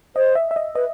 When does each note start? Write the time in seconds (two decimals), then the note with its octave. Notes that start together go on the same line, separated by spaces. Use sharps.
0.16 C5 D#5
0.35 E5
0.51 E5
0.56 D#5
0.75 B4 D#5